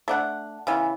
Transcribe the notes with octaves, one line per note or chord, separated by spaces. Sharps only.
A3 D4 F#5
C#3 E3 B3